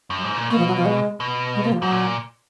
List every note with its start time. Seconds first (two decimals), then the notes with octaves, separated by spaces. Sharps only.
0.10 F#2
0.24 G#2
0.36 A#2
0.50 B2 A#3
0.58 F3
0.68 F#3
0.77 F3
0.86 G#3
1.20 B2
1.56 G#3
1.64 A#3
1.73 F3
1.81 G#2 F#3
1.91 A#2